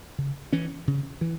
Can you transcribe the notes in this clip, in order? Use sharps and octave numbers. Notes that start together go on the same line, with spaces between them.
C#3
E3 C#4
C#3
E3